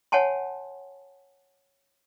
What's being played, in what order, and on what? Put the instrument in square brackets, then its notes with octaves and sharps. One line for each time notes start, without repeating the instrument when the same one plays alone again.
[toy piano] C#5 F#5 G#5 A5 C6